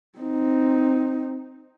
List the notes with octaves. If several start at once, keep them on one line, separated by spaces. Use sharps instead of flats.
C4 D#4